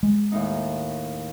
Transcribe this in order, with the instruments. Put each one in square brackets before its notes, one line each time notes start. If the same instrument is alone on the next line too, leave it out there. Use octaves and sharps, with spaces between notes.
[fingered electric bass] G#3
[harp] D#2 A2 D#4